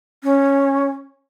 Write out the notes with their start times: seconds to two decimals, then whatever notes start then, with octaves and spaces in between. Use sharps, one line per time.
0.24 C#4